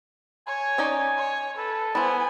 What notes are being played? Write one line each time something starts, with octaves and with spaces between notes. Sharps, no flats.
C#5 G#5
C#4 D#4 D5
C#5
A4 B4
B3 E4 C5 G#5